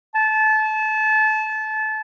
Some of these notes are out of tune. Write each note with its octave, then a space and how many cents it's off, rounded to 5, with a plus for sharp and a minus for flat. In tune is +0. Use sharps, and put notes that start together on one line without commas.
A5 -25